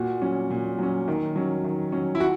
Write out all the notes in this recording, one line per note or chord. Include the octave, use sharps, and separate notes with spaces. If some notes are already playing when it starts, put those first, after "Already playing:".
Already playing: A#2 F#4
F#3 C#4
A#2
F#3 C#4
D#3
F#3 C#4
D#3
F#3 C#4
E4
F#4